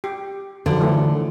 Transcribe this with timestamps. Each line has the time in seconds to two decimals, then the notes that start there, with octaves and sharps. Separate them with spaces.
0.04 G4
0.66 D3 D#3 F3 F#3
0.79 E3 F3 A3